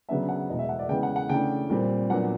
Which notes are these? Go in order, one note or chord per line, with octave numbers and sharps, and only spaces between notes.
C#3 F#3 B3 D4 E5
F#5
E2 B2 G#3 D#5
E5
F#5
D5
C#3 E3 G#3 B3 G5
F#5
F#5
C#3 E3 A3 D4 G5
A#2 G3 C4
A#2 F#3 B3 D4 F#5